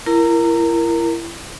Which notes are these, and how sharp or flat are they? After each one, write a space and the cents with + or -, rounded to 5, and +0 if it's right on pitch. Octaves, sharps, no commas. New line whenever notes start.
E4 +35 A#4 +0 A#5 -20